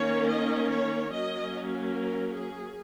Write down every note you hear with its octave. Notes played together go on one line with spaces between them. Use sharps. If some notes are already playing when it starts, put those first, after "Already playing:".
Already playing: D#3 A#3 C#4 C#5
D#5
C#5
F#3 A#3 C#4 D#5
A#4
G#4